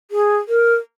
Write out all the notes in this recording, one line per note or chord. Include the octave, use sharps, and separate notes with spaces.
G#4
A#4